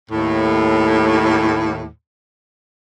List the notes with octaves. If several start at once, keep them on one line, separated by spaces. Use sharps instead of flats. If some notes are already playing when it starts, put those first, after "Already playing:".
D#2 A2